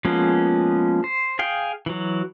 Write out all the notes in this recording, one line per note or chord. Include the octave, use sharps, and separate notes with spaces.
F3 G#3 A#3 B3 C#4
C5
G#4 F5 G5
E3 F#3